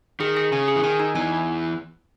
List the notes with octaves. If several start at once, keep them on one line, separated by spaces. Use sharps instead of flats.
D#3 G#4
G#4
C#3 G#5
G#4
E3
D#3 G#5
D#4
E2 E3 G#5